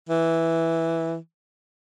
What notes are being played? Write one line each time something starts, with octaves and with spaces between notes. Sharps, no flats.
E3